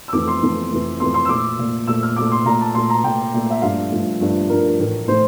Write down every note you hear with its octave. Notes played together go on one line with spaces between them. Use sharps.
E6
F2 E3 A3 D6
C6
F2 E3 A3
F2 E3 A3
F2 E3 A3 C6
C6
E6
A#2 A3 D6
A#2 A3
A#2 A3 E6
F6
A#2 A3 D6
C6
A#2 A3 A#5
A5
A#2 A3 C6
A#5
A#2 A3 G5
A#2 A3
E5
G2 F3 A3 F5
G2 F3 A3
G2 F3 A3
G2 F3 A3 A#4
A2 E3 A3
A2 E3 A3 C5